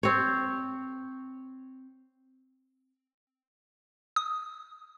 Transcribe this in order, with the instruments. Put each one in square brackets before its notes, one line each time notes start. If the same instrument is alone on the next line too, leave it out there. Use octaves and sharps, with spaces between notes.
[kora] C4 C#5
[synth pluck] D#6